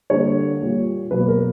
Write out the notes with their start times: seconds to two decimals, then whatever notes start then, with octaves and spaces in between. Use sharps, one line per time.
0.10 D3 G3 A#3 C#5
0.61 A#2 G3 A#3
1.11 B2 F#3 A#3 B4
1.28 A#4